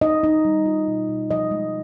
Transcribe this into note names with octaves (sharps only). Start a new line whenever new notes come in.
D#4 D#5
D#4
G3
F4
B2
B2
F3 D#5
G#3